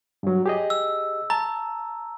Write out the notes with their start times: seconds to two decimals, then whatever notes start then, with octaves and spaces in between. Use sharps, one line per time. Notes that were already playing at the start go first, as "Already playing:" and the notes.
0.23 G2 F#3
0.46 G4 G#4 D#5
0.70 E6
1.30 A5 A#5